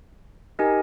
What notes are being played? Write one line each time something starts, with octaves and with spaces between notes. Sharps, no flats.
D#4 G4 A#4 D#5 G#5